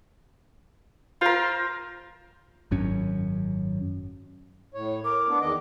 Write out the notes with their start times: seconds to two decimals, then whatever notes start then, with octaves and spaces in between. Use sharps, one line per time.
1.21 F4 A#4 C5
2.71 G#1 F#2 C#4
4.74 A2 C#5
5.04 A#4 D6
5.29 B3 D4
5.41 E2 D#3 D#5